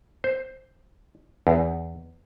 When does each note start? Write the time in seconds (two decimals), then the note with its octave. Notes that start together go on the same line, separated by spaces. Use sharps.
0.24 C5
1.47 E2